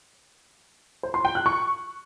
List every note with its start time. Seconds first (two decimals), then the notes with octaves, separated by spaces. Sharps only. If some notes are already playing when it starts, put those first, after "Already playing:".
1.03 C5
1.14 C6
1.25 G5
1.35 F#6
1.46 C#6